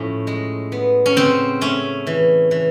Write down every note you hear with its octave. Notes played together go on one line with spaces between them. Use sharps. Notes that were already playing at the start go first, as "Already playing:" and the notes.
Already playing: A2 F3 C#4
G#3
B3
C#4
C#3 C4
A3 C#4
E3
E3